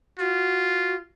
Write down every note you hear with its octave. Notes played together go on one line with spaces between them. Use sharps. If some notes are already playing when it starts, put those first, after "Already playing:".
F4 F#4